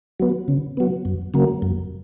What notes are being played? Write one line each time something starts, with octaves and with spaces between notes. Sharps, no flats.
F#3 B3
C#3
F#3 B3
F#2
C#3 F#3 A#3
F#2